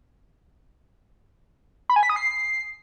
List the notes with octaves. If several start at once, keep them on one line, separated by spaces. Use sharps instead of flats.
B5
G#5
B6
D#6
C7